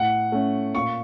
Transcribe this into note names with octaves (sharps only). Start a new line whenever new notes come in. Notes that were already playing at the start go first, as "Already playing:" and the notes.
Already playing: A2 F#5
A3 C#4
A#2 C#6